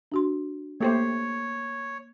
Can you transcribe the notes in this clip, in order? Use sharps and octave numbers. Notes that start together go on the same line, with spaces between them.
D4 F#4 C6
A3 A#3 G4 C5 C#5